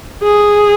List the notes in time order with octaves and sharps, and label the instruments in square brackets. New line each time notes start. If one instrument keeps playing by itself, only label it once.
[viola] G#4